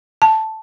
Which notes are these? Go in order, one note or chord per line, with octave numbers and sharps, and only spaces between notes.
A5